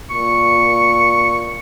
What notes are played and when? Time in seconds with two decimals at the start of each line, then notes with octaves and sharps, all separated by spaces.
0.11 A#2 C#6